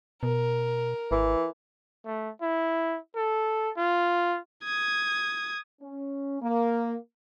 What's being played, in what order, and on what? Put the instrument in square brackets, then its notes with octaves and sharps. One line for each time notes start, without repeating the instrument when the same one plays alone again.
[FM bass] B2 [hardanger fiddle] A#4
[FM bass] G#1 [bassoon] E3
[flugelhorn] A3
E4
A4
F4
[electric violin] D#6 G#6
[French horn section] C#4
A#3